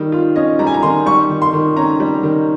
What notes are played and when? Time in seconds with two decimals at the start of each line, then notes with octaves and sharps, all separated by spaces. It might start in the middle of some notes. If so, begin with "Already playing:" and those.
Already playing: D#3 G3
0.12 F4
0.36 C#4 D#5
0.59 G3 A#5
0.67 G#5
0.74 A#5
0.83 D#3 C6
1.06 G3 C#6
1.29 D#3
1.42 C6
1.53 D#3
1.76 C#4 A#5
2.00 G3
2.23 D#3